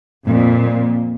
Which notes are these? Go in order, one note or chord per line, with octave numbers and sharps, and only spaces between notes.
F2 A#2